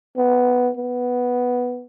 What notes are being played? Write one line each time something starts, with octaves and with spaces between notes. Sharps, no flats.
B3
B3